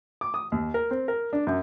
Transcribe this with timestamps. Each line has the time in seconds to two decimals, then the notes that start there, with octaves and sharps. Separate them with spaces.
0.21 D6
0.34 D#6
0.52 D#2
0.74 A#4
0.91 C4
1.08 A#4
1.33 D4
1.47 F#2